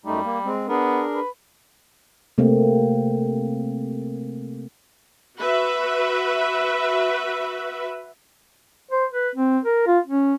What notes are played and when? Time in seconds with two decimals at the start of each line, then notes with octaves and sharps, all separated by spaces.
0.05 F#2 G3 A3 D#4
0.23 A#3
0.45 G#3 C4
0.68 B3 D4 G#4 A#4
1.15 B4
2.38 C3 A3 A#3 C4
5.38 F#4 B4 E5
8.91 C5
9.13 B4
9.35 C4
9.64 A#4
9.87 F4
10.07 C#4